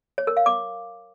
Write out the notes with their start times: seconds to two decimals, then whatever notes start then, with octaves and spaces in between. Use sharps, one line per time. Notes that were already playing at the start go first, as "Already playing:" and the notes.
0.18 C#5
0.27 A#4
0.37 F5
0.46 D6